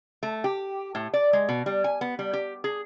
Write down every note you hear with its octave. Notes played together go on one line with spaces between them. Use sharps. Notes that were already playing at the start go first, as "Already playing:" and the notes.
A3
G4
A2
D5
G#3
B2
G3
G#5
B3
G3
G4
G#4